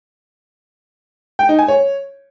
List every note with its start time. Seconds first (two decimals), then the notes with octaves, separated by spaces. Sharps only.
1.39 G5
1.49 D#4
1.59 G#5
1.68 C#5